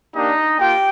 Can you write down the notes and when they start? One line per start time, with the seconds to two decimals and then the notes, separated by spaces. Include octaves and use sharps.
0.16 A#3 D4 D#4 G4 D#5
0.60 A#3 F4 G4 G5